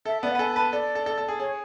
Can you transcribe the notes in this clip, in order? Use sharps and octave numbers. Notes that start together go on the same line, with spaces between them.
A4 E5
B3 D5
F#5
B4
A4 G#5
B4 A5
A4 D5
A4
A4
A4
G#4
G#4 C#5